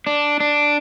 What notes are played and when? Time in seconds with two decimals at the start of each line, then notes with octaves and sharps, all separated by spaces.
0.07 D4
0.40 D4